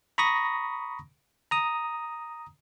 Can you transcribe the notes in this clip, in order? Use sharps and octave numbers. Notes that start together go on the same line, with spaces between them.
A#5 B5 C#6 D#6 A#6
A#5 D#6